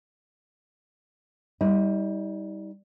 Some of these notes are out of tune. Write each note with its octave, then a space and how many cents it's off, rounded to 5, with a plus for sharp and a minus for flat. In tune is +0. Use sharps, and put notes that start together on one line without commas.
G3 +0 D#4 +35